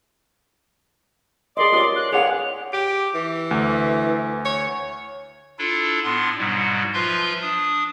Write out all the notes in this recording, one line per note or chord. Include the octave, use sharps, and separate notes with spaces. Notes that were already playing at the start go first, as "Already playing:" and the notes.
G#4 A#4 D5 D#5 C6
E2 C#4 F4 G4 D5 D#6
F#6
D3 D#3 B3 G#4 C#5 F#5 F7
G4 D7
E3
D2
C#5
D4 E4 F4 A4
A2 B3 D4 C6
G#2 B2 F#3 G3
F3 F4 B4 E5 C6 G6
D4 D#6